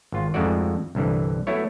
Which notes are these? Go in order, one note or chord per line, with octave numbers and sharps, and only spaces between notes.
G#1 F4
F2 G#2 G#3 A3 F#4 D5
C2 G2 D3 E3
F#3 A3 B3 E4 C#5